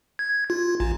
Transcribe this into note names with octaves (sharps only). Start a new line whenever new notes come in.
G#6
F4
A1